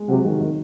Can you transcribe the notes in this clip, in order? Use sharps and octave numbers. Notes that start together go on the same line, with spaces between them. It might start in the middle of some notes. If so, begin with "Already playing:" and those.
Already playing: G#3
C3 F#3
D#3
D#3